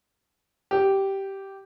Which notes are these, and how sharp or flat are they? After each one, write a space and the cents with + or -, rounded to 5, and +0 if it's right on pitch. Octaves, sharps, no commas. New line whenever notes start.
G4 -10